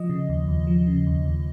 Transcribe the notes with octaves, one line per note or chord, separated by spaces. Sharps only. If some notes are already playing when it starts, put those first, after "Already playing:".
Already playing: F3 D#5
C#3
D#2
D#2
F3
C#3
D#2
D#2